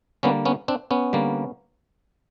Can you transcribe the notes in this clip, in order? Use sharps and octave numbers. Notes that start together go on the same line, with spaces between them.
D3 G3 A#3 B3 C#4
B3 C#4
C4 D4
B3 C#4
D3 G3 A#3